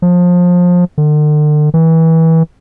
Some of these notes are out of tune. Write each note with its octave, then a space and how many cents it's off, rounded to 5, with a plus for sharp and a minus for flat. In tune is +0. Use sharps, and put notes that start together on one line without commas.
F3 +25
D3 +40
E3 -25